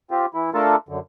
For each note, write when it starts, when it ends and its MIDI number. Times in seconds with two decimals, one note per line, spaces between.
0.11 0.26 60
0.11 0.26 65
0.11 0.26 67
0.34 0.50 52
0.34 0.50 64
0.54 0.76 57
0.54 0.76 62
0.54 0.76 65
0.54 0.76 69
0.54 0.76 70
0.54 0.76 81
0.89 0.99 42
0.89 0.99 50